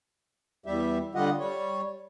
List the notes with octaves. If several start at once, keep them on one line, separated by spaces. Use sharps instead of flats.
E2 G3 G4 E5
D3 G3 F4 G4 D#5 F#5
G3 C#5